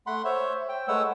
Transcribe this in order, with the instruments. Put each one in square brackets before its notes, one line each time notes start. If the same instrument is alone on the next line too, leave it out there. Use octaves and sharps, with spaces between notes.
[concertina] A3 F#5 B5 C6
C5 C#5 E5
G5
G#3 A3 B4 C#5 F#5 E6